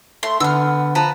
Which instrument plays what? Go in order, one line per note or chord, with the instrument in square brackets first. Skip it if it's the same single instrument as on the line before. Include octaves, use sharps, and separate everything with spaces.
[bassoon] A3 [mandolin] C6
[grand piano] D3 [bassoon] B3 [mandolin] E6 F6
[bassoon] F3 [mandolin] B4 A5 A#5